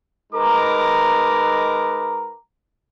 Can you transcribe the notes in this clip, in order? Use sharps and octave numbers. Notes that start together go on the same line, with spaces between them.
G#3 D#4 A#4 B4 A#5 D6